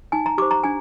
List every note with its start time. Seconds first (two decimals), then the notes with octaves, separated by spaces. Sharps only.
0.12 D#4 G#5
0.26 A#5
0.38 G4 C5 D6
0.51 A#5
0.63 D4 G#5